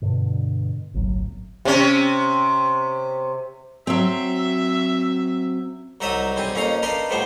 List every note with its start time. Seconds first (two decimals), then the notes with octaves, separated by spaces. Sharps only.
0.02 G2 B2 D3
0.94 G1 C2 A2 F#3
1.65 C3 C#4
3.87 F#3 C4 E5
6.01 C2 F#3 D#4 D5 E5 D#6
6.36 B1 G3 C4 G#5
6.54 F2 A#3 C#4 D#4 F5 A#5
6.83 D4 D#4 A#4 B4 F5 C6
7.10 A2 F3 G3 B3 C5